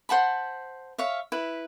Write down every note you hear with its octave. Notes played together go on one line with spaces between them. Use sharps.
C5 F#5 A5 B5
C#5 E5 F5
E4 B4